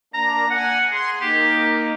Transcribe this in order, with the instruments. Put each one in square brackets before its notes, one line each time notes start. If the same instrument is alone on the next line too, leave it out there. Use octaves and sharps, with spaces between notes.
[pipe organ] A#3 D4 [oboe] A#5
[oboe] F#5 [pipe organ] G#5
[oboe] G#4 [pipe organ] C6
[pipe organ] A#3 D#4 [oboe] G4